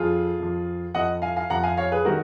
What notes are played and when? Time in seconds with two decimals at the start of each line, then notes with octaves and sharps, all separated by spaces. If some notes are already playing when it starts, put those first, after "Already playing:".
Already playing: F2 F3 F4 G#4
0.39 F2 F3
0.94 F2 F3 D#5 F#5
1.22 F5 G#5
1.36 F5 G#5
1.50 F2 F3 F#5 A#5
1.63 F5 G#5
1.77 C#5 F5
1.92 G#4 B4
2.05 D#3 F#3 F#4 A#4